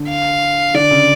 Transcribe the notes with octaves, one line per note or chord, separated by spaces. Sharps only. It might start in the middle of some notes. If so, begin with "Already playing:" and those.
Already playing: D3
F5
D3 D5
C#3